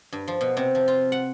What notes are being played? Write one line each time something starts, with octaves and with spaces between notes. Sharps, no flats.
G2
F3
B2
C3
F3
F4
F#5